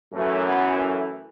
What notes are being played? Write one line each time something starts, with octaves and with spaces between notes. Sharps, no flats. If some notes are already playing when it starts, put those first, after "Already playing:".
F#2 E3 A3
B3
A3